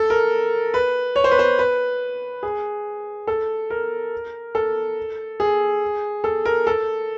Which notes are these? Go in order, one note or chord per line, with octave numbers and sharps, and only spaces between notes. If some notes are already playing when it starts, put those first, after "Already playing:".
Already playing: A4
A#4
B4
C#5
C5
B4
C5
B4
G#4
A4
A#4
A4
G#4
A4
A#4
A4